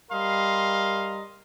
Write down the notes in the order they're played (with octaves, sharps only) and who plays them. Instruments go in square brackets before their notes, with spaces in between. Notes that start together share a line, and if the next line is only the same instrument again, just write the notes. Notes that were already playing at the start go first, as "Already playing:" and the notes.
[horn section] G3 A#4 D#5 F5 C6